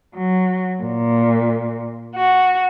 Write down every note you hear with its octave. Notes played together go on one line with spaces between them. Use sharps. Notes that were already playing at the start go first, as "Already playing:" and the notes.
F#3
A#2
F#4